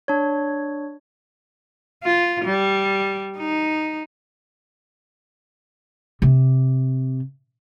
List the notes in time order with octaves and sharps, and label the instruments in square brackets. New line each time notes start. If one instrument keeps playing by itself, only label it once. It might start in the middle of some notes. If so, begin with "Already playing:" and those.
[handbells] D4 C#5
[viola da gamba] F4
G3
D#4
[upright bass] C3